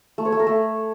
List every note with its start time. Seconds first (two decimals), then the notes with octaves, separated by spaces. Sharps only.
0.18 A3
0.25 C#5
0.32 A3
0.39 A#4
0.47 A3